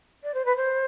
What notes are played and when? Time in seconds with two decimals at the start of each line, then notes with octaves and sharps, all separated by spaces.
0.23 D5
0.34 C5
0.45 B4
0.56 C5